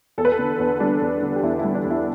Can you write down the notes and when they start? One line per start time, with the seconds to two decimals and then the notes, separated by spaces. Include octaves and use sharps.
0.18 E2 A4
0.25 B4
0.32 A4
0.39 D3
0.59 E2
0.80 G3 D4
1.02 E2
1.23 D3
1.36 G4
1.43 E2 E4
1.59 E4
1.64 G3
1.75 D4
1.85 E2
1.90 E4